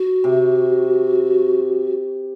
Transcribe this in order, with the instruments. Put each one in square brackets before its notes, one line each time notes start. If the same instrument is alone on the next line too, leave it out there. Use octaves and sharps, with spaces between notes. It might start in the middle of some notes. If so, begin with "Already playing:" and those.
Already playing: [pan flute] F#4
[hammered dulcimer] C3